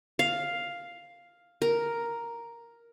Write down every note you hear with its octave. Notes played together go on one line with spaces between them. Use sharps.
F5
A#4